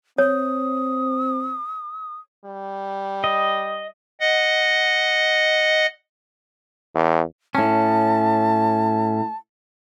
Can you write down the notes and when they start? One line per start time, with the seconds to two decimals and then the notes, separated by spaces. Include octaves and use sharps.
0.18 C4 C#5 D#6
2.45 G3
3.24 D#5
4.20 D#5 F#5
6.95 E2
7.55 A2 C#4 A5